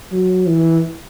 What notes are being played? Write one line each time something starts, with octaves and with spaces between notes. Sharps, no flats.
F#3
E3